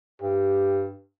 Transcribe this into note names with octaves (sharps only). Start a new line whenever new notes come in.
G2 G4